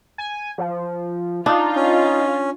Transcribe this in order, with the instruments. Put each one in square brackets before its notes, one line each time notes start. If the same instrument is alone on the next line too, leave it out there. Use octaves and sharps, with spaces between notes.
[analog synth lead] G#5
F3
[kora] D4 [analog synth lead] D#4 [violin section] F4
[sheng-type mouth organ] C#4